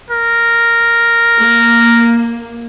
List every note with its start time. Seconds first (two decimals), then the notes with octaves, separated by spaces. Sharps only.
0.11 A#4
1.39 A#3